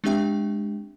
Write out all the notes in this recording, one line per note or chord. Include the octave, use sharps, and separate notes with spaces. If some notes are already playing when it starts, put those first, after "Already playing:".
G#3 C4 D4 G4 E5 G5